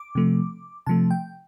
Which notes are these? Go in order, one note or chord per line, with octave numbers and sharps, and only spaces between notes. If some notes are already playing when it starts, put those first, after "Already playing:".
Already playing: D6
C3 F3 A3
C3 F3 A3 A5
G5